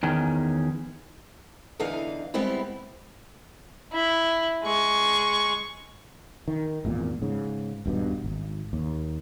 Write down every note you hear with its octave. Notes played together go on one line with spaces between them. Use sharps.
E2 D#3 C#4
E2 D3 E3 D#4 F5
G3 G#3 B3 C4 E4
E4
G#3 C#6
D#3
G#1 E2 A#2
G#2 C#3
D#1 G2 B2
G#1
D#2